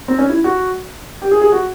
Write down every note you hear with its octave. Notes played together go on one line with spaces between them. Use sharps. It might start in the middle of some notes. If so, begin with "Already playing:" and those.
C4
C#4
E4
F#4
G4
G#4
G#4
F#4